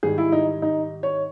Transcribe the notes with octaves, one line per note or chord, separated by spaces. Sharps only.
G#2 D#3 G3 G#4
E4
D#4
D#4
C#5